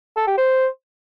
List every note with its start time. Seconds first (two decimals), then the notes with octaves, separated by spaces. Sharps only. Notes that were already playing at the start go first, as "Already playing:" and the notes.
0.17 A4
0.27 G4
0.37 C5